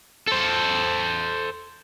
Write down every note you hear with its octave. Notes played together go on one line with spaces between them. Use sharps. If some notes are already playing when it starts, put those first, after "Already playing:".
A4 C5